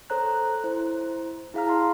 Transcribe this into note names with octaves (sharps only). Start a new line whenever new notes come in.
A4 C5 C#5 A#5 F#6
E4 C5
E4 G#4 F5 A#5 F6
A5 C6